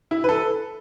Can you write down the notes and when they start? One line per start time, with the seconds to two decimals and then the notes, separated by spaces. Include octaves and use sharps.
0.11 E4
0.24 B4
0.29 A4